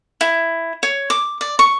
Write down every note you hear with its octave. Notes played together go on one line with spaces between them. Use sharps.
E4
C#5
D6
D5
C#6